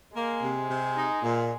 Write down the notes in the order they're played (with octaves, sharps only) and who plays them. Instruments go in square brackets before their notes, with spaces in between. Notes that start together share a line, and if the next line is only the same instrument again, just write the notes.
[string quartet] G#3 [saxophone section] A#3
[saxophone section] C3
C3
D#4
A#2